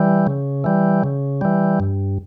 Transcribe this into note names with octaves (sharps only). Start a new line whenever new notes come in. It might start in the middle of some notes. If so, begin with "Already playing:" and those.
Already playing: E3 G3
C#3
E3 G3
C#3
E3 G3
G2